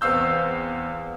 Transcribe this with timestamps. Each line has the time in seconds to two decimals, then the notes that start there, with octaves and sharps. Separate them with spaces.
0.01 E2 B3 C4 F5 E6 G6